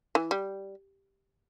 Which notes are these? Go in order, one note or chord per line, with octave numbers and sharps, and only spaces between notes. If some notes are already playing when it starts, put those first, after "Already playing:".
E3
G3